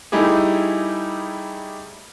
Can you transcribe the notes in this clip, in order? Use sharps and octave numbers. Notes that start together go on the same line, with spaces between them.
G3 A3 D#4 E4 G4 G#4